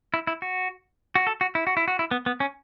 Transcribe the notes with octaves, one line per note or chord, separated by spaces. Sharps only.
E4
E4
F#4
F#4
A4
F#4
E4
F#4
E4
F#4
E4
B3
B3
C#4